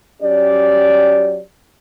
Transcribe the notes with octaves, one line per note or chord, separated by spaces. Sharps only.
F#3 C#4 G4 D5